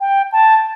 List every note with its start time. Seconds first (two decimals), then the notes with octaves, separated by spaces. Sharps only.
0.01 G5
0.32 A5